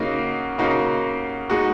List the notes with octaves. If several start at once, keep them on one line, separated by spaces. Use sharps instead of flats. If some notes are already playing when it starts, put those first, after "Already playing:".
Already playing: C#3 A#3 D#4 F#4
C#3 A#3 D#4 F#4
G#3 D#4 F#4